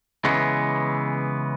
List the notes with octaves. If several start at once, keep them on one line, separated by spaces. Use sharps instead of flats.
C#3 E3 G#3 B3